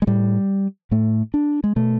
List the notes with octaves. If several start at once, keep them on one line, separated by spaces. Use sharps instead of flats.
G#3
A2 G3
A2 A3
D4
G#3
B2 A3